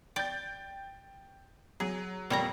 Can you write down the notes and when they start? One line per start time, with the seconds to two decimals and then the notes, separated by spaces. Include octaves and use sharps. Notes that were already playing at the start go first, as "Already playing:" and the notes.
0.16 D5 G5 G6 A6
1.80 F#3 G#4
2.30 F2 A#2 G3 C#5 A#5